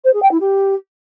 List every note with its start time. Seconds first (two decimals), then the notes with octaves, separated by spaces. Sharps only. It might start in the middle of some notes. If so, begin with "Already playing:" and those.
0.04 C5
0.13 G#4
0.22 G5
0.31 E4
0.40 G4